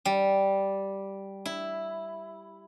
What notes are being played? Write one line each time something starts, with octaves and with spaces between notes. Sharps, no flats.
G3
E4